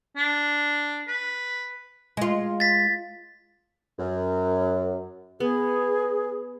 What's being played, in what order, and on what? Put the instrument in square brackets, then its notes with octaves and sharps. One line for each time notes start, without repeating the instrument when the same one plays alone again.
[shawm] D4
B4
[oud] G#3 F4
[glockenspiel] A6 B6
[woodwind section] F#2
[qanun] B3 [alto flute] G#4